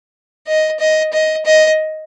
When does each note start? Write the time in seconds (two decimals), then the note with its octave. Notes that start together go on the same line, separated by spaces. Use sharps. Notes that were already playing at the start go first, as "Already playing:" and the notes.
0.47 D#5
0.80 D#5
1.13 D#5
1.46 D#5